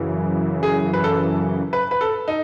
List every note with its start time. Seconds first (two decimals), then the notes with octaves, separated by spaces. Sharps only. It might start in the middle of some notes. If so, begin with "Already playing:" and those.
Already playing: F#2 C#3 E3
0.63 G#4
0.94 B4
1.04 A4
1.73 B4
1.91 B4
2.01 A4
2.28 D#4